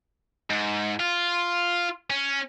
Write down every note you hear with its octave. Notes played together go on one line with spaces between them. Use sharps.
G#2
F4
C#4